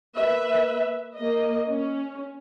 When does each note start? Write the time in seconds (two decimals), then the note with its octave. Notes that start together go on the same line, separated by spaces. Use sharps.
0.15 A#3 B4 E5
1.16 A#3 D#5
1.68 C#4